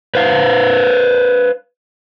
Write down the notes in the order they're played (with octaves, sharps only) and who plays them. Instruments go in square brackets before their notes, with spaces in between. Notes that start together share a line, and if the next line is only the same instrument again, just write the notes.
[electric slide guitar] B4 C5 F5